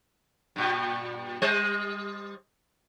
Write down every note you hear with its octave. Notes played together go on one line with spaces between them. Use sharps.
G2 A#2
G3 C5 D#5